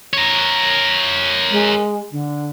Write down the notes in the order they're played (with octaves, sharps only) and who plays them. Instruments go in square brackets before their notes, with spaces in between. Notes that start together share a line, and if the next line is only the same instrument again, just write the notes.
[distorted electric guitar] A#4 C#5
[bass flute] G#3
D3